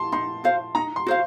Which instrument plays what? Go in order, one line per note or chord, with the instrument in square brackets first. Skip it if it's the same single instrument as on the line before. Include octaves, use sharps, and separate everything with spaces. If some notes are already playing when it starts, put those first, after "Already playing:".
Already playing: [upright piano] A5 C6
[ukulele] D#4 [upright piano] C6
[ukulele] F#4 C5 F5
[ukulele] D#4 [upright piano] A#5
[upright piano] C6
[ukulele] F#4 C5 F5